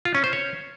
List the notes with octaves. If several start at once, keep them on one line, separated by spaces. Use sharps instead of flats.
F4
C#4
C5
C#5